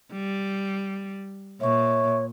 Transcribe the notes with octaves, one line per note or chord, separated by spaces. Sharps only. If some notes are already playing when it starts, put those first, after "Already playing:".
G3
A#2 C#5 E5 C#6